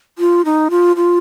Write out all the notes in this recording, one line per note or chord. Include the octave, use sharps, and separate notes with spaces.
F4
D#4
F4
F4